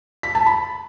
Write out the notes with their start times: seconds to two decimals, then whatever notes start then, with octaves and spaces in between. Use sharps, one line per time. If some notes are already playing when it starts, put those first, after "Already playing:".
0.23 B6
0.35 A5
0.46 B5